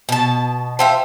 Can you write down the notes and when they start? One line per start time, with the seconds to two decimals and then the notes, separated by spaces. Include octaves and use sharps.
0.09 B2 A5
0.79 C5 E5 F5 G5 A5